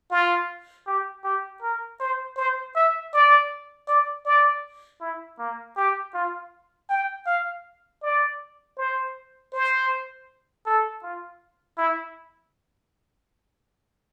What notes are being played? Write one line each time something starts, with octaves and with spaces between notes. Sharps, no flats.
F4
G4
G4
A#4
C5
C5
E5
D5
D5
D5
E4
A#3
G4
F4
G5
F5
D5
C5
C5
A4
F4
E4